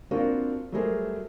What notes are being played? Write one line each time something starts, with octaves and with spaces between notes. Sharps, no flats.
A#3 C4 D4 F4 F#4 A#4
F#3 G3 A3 G#4 A#4 C5